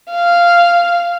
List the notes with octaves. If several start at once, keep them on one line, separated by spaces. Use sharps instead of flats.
F5